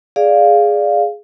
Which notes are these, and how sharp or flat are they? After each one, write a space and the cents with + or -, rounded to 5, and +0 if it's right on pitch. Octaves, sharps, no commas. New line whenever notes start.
G#4 +0 D5 +0 F5 +0